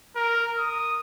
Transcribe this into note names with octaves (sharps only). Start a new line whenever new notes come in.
A#4
D#6